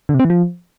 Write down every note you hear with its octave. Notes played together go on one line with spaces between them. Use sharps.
D3
C3
C4
E3
F3